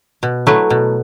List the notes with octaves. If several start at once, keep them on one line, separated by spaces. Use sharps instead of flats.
B2
F#3 A3 E4 B4
B2